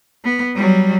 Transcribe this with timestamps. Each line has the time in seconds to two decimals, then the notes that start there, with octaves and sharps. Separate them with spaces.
0.24 B3
0.56 F#3 G3